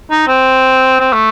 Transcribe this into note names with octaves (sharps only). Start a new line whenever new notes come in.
D#4
C4
C4
A3